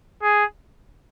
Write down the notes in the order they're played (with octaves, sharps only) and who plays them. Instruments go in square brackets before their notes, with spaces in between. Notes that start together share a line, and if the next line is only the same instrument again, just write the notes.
[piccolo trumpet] G#4